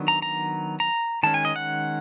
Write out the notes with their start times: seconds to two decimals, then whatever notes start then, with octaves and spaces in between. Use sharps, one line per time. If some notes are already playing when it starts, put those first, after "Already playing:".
Already playing: D#3 F#3 B3 D4
0.08 A#5
0.22 A#5
0.80 A#5
1.23 D#3 G#3 C#4 A5
1.34 G#5
1.45 D#5
1.56 F#5